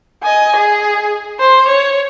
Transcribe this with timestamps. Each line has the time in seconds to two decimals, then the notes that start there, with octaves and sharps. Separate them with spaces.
0.23 D#5 G#5
0.57 G#4
1.39 C5
1.68 C#5